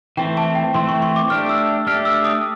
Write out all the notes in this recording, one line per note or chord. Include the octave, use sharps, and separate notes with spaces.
E3 A3 C4 G5
A5
G5
E3 A3 C4 C6
C#6
C#6
D6
A3 D4 G4 F6
E6
A3 D4 G4 F6
E6
D#6